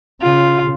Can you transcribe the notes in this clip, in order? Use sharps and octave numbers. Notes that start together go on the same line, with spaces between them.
C#3 F4